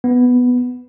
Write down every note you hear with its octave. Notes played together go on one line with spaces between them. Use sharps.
B3